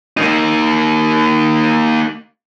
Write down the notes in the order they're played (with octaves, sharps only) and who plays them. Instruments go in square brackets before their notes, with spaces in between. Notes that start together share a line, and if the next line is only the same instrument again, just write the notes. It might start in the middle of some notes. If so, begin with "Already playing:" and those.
[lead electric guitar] A#3 D#4